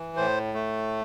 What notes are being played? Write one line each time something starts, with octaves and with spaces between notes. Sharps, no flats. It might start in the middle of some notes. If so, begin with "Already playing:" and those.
Already playing: E3
A2 C5
A3